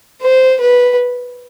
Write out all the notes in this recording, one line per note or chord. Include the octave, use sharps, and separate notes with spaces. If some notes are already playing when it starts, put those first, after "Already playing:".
C5
B4